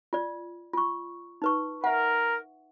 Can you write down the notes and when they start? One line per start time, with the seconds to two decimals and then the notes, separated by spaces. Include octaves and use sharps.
0.13 F4 D5
0.73 F4 C#6
1.42 D#4 B4 C#6
1.84 A#4 E5 F#5